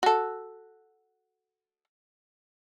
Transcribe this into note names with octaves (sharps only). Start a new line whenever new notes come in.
F#4 A4